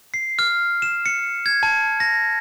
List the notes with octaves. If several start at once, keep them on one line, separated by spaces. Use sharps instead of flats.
C7
F6
E7
C#7
G#6
A5
A#6